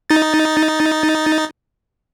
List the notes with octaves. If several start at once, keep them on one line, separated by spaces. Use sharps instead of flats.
D#4 A6